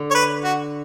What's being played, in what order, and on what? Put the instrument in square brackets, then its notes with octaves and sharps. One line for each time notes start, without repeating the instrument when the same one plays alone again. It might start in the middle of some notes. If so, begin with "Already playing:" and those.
Already playing: [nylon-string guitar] D3
[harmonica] C#5
B4
F#4